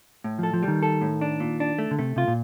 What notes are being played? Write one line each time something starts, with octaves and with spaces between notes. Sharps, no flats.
A2
F3 A4
F3
G3
D#3
A4
A2
D4
A#2
D4
A3
D3
C3 A3
C3 F4
A#2